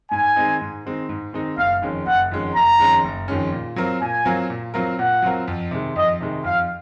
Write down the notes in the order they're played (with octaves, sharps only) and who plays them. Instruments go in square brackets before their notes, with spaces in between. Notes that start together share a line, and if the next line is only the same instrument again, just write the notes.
[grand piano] G#2 [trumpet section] G#5
[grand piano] D#3 G#3 C4 D#4
G#2
D#3 G#3 C4 D#4
G#2
D#3 G#3 C4 D#4
[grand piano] F#1 [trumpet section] F5
[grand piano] F2 D#3 G#3 C#4
[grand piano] F#1 [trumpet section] F#5
[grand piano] F2 D#3 G#3 C#4
[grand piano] F#1 [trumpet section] A#5
[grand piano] F2 D#3 G#3 C#4
F#1
F2 D#3 G#3 C#4
A#2
F#3 C4 F4 A#4
[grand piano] A#2 [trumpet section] G#5
[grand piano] F#3 C4 F4 A#4
A#2
F#3 C4 F4 A#4
[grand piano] A#2 [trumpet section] F#5
[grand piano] F#3 C4 F4 A#4
F2
C3 D#3 G#3
[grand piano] F2 [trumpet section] D#5
[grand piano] C3 D#3 G#3
[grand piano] F2 [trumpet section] F5